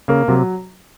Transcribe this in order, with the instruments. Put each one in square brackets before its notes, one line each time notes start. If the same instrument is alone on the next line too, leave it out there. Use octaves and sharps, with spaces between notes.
[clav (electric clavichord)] C#3 [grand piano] A#3
[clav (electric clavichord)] C3 [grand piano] F#3